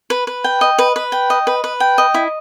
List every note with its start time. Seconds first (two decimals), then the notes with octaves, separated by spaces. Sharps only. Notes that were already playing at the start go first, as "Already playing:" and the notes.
0.10 B4
0.27 B4
0.44 G5
0.61 D#5
0.78 B4
0.96 B4
1.12 G5
1.30 D#5
1.47 B4
1.64 B4
1.80 G5
1.98 D#5
2.14 E4